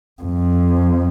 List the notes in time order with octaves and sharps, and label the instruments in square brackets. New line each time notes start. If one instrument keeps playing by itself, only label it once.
[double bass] F2